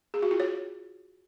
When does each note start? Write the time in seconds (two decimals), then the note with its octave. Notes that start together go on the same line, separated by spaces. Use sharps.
0.14 G#4
0.22 F#4
0.31 F4
0.40 C#5